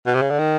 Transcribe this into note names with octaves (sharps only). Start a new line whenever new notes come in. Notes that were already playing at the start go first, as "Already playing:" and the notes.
B2
C3
C#3
D3
D#3